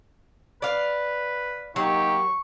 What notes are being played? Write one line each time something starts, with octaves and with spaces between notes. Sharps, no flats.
B4 D5 F5
F#3 A#3 D#4 G4 C#6